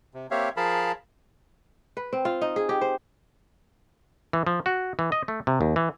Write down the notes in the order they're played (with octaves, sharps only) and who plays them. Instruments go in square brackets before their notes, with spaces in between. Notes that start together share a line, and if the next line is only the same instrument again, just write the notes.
[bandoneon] C3
A#3 C4 G4 C#5 E5 F5
F3 G#4 A#4 F5 A5 B5
[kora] B4
C4
F4
D#4
G#4
G4
C5
[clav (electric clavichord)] E3
F3
F#4
E3
D#5
A3
C3
D#2
E3